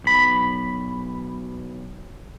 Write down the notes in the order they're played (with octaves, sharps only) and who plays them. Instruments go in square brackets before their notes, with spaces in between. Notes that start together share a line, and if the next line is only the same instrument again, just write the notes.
[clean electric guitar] B1 B5